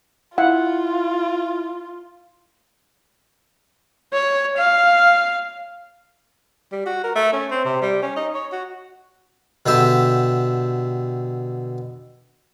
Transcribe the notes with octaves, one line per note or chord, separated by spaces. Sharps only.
E4 F4 F5 F#5
C#5
F5
G3
F#4
A#4
A3
C#4
C4
C3
G3
C#4
D#4
C#5
F#4
B2 D3 G4 E5